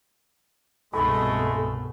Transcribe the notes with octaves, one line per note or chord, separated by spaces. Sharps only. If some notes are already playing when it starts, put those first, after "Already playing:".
C2 G2 B2 G#3 A3 A4 B5